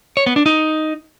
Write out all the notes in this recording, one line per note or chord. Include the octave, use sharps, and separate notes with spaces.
C#5
B3
D4
D#4